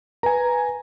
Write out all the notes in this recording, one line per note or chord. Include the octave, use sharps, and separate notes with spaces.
B4 G#5 A#5